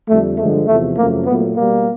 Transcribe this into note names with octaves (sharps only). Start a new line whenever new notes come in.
F2 D3 G3 A3
G2 D3 F3 G#3 A3
E2 C3 F3 A3
F#2 C#3 F3 A3 A#3
A#2 F#3 A3 B3
B2 G3 A#3